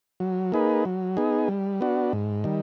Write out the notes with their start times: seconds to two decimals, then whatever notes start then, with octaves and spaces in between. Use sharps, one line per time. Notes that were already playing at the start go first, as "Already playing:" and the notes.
0.20 F#3
0.52 A#3 D#4 G#4 B4
0.85 F#3
1.17 B3 D#4 G#4
1.48 G3
1.81 B3 D4 F#4
2.13 G#2
2.44 D#3 G3